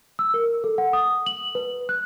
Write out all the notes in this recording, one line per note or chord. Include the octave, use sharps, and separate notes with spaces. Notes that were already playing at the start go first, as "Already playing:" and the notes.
E6
A#4
A4
F#5
D#6
F#7
B4
F#6